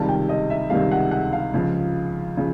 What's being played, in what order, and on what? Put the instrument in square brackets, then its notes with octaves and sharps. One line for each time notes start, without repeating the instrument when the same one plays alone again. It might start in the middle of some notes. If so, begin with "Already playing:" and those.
Already playing: [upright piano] C#2 C3 D#3 G3 A5
G5
D#5
E5
C#2 C3 D#3 G3 F5
F#5
F#5
F5
C#2 C#3 F3
C#3 F3